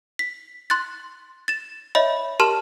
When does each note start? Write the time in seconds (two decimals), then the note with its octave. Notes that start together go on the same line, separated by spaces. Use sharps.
0.19 B6
0.70 C6 F#6 A6
1.48 A6 E7
1.95 C#5 D#5 E5 B5
2.40 G4 A#4 A5 C6 F6 E7